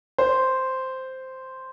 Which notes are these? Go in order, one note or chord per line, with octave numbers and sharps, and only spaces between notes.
C5